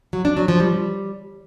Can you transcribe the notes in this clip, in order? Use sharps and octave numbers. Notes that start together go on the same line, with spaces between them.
F#3
D4
F#3
F3
G3